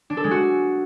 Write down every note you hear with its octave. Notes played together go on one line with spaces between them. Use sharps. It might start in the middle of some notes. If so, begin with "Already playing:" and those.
D4
A4
G#3
F#4